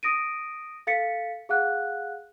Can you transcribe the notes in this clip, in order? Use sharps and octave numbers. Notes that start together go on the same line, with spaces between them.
D#6 A#6 D7 D#7
A4 F5 A6 B6 C#7
G#4 F5 F#5 F#6